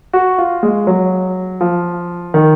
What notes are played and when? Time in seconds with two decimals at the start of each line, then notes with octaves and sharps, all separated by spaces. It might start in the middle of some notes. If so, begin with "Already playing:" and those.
0.13 F#4
0.38 F4
0.63 G#3
0.87 F#3
1.61 F3
2.34 D#3